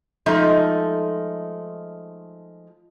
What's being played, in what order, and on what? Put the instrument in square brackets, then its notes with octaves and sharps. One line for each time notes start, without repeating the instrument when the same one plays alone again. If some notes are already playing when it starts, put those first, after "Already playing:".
[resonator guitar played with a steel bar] F3 G#3 A3 D#4